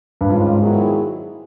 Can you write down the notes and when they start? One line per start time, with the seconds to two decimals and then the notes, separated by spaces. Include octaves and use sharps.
0.21 G2
0.28 G#2 D#3 G#3 C#4 F4
0.60 D#3 F#3 B3 E4 G#4